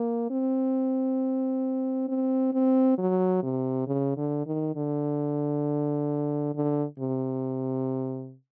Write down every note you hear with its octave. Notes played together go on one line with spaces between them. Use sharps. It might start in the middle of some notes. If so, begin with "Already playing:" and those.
Already playing: A#3
C4
C4
C4
F#3
C3
C#3
D3
D#3
D3
D3
C3